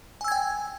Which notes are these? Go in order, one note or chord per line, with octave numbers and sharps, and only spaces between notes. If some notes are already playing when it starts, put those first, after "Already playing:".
G5 G#5 E6 G#6